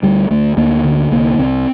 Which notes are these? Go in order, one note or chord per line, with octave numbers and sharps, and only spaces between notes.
D2 G3
D2 A3
D2 A#3
D3
C2 A#3
C2 C4